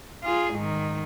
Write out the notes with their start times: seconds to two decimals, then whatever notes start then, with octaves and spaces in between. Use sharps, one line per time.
0.24 F4 G#4
0.54 G#2 D#3